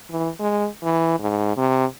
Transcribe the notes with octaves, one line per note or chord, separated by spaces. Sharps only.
E3
G#3
E3
G#2
C3